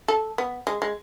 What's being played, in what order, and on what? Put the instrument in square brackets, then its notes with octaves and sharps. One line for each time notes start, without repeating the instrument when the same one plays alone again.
[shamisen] A4
B3
G#3
G#3